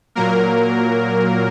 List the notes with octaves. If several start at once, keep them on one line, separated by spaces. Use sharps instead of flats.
A#2 F#3 A#3 A#4